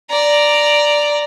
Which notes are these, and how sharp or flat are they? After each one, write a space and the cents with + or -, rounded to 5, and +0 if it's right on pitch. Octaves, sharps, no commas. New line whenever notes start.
D5 +0 A#5 +0